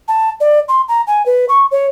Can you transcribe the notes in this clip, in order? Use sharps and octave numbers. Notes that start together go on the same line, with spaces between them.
A5
D5
C6
A#5
G#5
B4
C#6
C#5